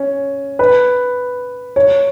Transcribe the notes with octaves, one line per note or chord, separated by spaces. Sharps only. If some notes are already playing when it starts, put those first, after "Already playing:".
Already playing: C#4
B4
C#5